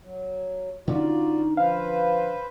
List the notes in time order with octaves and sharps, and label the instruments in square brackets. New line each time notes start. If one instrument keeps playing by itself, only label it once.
[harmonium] F#3
[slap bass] D3 C#4 [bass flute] D#4 [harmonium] F4 F#4 D5
[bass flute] F3 [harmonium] B4 C5 [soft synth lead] F5